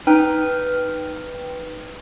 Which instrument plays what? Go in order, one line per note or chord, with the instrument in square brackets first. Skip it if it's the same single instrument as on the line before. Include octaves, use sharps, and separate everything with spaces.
[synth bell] D#4 B4 G5 F6